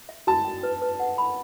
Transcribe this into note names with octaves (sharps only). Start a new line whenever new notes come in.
E5
F#4 A5
G5
B4
B4
F#5
B5